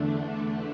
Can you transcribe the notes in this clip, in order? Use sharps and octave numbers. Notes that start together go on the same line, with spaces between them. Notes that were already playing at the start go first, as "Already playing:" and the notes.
Already playing: E2 D3 A3 D4